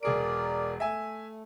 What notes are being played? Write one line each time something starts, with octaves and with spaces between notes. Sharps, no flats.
E1 G#4 A#4 D5 D7
A3 E5 G#5